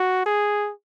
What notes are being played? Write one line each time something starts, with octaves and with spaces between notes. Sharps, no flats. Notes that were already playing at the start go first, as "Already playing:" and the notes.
Already playing: F#4
G#4